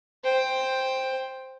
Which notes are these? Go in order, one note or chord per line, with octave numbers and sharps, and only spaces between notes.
C5 G5